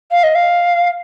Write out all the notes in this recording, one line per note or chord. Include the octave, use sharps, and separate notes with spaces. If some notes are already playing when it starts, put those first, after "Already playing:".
F5
D#5
F5